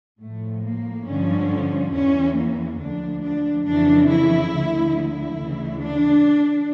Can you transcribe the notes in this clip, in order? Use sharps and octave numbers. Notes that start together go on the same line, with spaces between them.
A2 F3 A3
A#3
G2 D3 F3 C#4
E2 E3 C#4
A#3
D2 D3 F3 D4
D4
F2 C#3 E3 D4
E4
D2 D3 F3
E4
D2 C#3 E3
D4